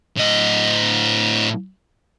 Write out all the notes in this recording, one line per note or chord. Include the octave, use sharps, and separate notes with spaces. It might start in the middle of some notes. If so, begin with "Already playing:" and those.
A2 D#5